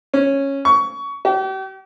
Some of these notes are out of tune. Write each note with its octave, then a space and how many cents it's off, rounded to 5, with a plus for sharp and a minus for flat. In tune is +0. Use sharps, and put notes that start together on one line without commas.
C#4 -10
C#6 +20
G4 -40